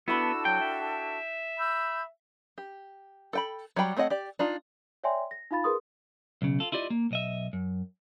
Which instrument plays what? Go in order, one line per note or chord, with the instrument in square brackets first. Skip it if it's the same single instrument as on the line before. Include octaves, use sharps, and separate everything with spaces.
[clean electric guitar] B3 [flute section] D4 F#4 A4 [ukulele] E4 B5 [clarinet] E6
[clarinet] F#3 [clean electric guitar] G5
[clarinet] E5
[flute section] B5 E6 G6
[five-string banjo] G4
A4 G5 B5
F#3 G3 F#5 G5 B5
A3 C4 C#5 D#5 F#5
G4 D5
D4 D#4 F4
[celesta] C#5 D5 E5 G5 G#5 C6
A#6
D#4 F4 F5 B5 A6
G#4 A#4 B4 C6 D#6
[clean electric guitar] B1 C#3
F4 A4
E4 F4 G4 D5 D#5
A#3
B1 D#5 E5
F#2